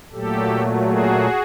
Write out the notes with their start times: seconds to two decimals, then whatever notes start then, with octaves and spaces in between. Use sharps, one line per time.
0.12 A#2 F#3 A3 G4 A4
0.84 F#4 G#4